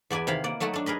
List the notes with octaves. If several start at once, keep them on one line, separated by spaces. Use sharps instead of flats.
E2 B3 D5 E5 G#5
C3 D#3 E4 F5 A#5 B5
A#3 D5 F#5
F#3 A3 D#4 F#4 A4
D4 A4
G#4 A#4 B4 D#5